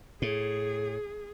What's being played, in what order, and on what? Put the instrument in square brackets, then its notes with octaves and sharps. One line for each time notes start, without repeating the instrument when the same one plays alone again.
[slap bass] A2 [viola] G#4